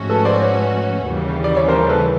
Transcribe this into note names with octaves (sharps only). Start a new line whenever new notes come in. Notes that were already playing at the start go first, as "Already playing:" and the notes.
Already playing: G#2 F3 A3 C#4 F#4
A4 B4
C5 D5
B4 C#5
D#2 C#3 E3 G3
D5
C#5
A#4 C5
A4 B4